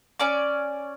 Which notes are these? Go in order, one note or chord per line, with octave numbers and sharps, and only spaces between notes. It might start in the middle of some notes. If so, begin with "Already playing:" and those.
C#4 D5 D6